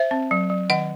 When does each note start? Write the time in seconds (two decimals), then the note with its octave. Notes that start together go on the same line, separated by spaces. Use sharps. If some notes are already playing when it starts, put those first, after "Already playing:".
Already playing: C5 E5
0.11 C4
0.31 F#3
0.50 F#3
0.70 D#3 D#5 F#5